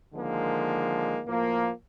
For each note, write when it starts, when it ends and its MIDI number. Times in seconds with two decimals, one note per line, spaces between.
0.14 1.20 50
0.14 1.20 51
0.14 1.20 53
0.14 1.20 56
0.14 1.20 58
1.26 1.69 45
1.26 1.69 53
1.26 1.69 58